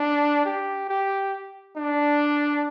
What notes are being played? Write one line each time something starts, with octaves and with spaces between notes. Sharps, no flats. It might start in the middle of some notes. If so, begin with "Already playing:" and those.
Already playing: D4
G4
G4
D4